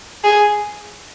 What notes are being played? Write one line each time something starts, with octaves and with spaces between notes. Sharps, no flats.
G#4